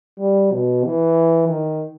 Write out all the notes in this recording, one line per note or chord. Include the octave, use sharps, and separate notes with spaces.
G3
B2
E3
D#3